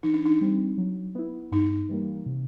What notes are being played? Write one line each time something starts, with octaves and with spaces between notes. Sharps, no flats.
E3 D#4
D4
D#4
G3 C4
F#3
B3 E4
G2 D#4
E3 G3 A#3
C3